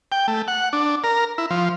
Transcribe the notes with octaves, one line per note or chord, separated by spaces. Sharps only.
G5
A3
F#5
D4
A#4
E4
F3